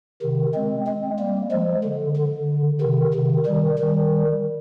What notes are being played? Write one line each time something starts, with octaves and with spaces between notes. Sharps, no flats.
C3 D#3
G#3 C4
G#3 C4
G3 A#3
F3 G#3
D3
D3
C3 D#3
C3 D#3
D#3 G3
D#3 G3